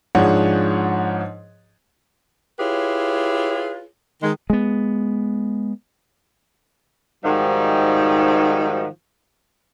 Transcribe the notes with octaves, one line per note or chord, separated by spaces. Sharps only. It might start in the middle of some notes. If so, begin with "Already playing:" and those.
G#2 F3 D4 G#4 C#5 F#5
E4 F4 G4 G#4 B4 C#5
D#3 G#3
G#3 B3
G#2 D#3 F3 G3 D#4 F#4